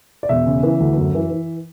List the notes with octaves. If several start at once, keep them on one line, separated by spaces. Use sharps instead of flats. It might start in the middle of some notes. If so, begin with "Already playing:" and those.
D5
E1 E5
C#3
E3
D2
F#2
E3
E3